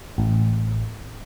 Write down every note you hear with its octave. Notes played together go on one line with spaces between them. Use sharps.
A1